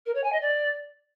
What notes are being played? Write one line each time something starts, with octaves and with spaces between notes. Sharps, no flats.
A#4
C#5
G#5
D#5
D5